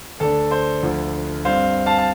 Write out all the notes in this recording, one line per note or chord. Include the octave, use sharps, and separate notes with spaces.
D2 D3 A3 D4 A4
C5
D2 D3 F3
G2 G3 C4 C5 F5
F5 A5
A5